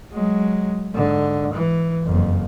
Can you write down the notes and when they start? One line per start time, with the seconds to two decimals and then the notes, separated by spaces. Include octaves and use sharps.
0.12 F#3 G#3
0.95 G#2 D3
1.53 E3
2.03 F#1 F2